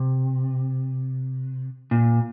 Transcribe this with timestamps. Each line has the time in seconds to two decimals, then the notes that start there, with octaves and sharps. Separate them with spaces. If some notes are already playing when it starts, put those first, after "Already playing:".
Already playing: C3
1.91 A#2